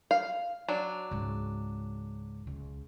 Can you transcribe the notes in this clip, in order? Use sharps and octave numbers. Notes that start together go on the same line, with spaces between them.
F5
F#3 D4
C#2 G#2
C#2